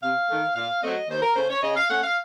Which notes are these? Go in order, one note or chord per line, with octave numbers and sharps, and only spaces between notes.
C3 F5
D#3 A3
A#2 F5
F#3 A3 C4 D#5
D#2 C5
A#4
C#3 A3 C#4 C5
C#5
C#3 D#5
F5
A3 C#4 F#5
F5